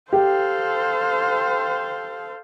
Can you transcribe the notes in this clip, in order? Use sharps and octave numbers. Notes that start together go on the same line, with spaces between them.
G4 A4 C5 F5